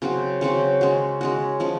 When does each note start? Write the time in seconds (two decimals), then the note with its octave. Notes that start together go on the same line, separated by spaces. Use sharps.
0.02 C#3 F#3 C4 F#4
0.41 C#3 F#3 C4 F#4
0.81 G#3 C#4 F#4
1.21 G#3 C#4 F#4
1.60 C#3 F3 G#3